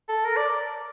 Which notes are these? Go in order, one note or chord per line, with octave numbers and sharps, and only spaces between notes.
A4
A#4
D5